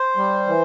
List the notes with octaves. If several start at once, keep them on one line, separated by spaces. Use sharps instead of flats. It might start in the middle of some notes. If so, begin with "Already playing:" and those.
Already playing: C5
G3
E3